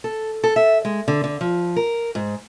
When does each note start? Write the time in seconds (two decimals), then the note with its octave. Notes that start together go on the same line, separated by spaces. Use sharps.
0.04 A4
0.44 A4
0.56 E5
0.85 G#3
1.08 D3
1.24 D3
1.41 F3
1.76 A#4
2.15 G#2